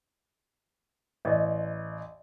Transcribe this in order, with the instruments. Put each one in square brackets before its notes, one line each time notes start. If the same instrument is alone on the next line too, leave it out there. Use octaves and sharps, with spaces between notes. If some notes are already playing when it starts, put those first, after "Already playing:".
[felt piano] A1 [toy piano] D5 D#5